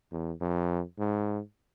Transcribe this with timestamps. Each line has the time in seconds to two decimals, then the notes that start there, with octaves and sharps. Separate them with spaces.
0.12 E2
0.41 F2
0.99 G#2